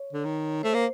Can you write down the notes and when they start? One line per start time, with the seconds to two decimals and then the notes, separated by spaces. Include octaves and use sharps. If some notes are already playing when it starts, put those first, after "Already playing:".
Already playing: C#5
0.13 D3
0.25 D#3
0.63 A3 C5
0.74 A#3